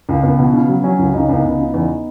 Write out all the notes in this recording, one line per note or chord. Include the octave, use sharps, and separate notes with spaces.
C#2
C#2 B3
B2
C#3
F#3
F#3 C#4
C#2
C#2 D#4
C#4
C#2 B3 D#4
C#2
C#3
E2 B3 D#4